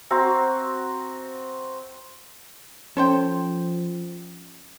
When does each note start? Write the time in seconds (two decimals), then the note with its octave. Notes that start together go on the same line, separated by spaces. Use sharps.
0.11 C4 F#4 A#5
2.97 F3 C#4 A4 C5 G5